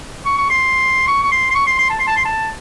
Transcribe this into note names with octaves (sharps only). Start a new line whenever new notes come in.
C#6
C#6
C6
C#6
C#6
C6
C6
C#6
C6
C6
A5
C6
A5
C6
A5